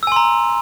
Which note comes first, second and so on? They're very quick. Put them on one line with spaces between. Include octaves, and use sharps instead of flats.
E6 G#5 C6 A#5